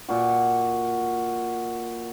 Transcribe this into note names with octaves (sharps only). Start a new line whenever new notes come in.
A#2 F#4